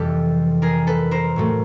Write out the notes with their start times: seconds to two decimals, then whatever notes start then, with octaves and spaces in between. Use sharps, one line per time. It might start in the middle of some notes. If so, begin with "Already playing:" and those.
Already playing: F2 C3 E3 G3 G4 A4
0.62 G#4 A#4
0.87 A4 B4
1.11 A#4 C5
1.36 A2 F#3 A3